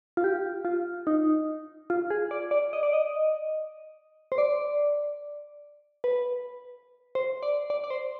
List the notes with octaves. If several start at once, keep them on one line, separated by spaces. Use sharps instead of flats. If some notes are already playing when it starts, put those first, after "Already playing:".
F4
G4
F4
D#4
F4
G#4
D5
D5
D#5
D5
D#5
C5
D5
B4
C5
D5
D5
D5
C5